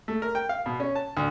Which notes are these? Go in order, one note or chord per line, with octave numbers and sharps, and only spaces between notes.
A3
A#4
G5
F5
B2
C#4
A5
D2